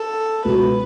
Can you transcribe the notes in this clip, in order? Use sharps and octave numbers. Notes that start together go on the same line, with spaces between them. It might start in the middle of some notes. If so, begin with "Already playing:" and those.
Already playing: A4
C#2 B2 F#3 B4